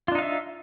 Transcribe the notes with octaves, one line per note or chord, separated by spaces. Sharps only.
D4 D#4 F4 E5 F5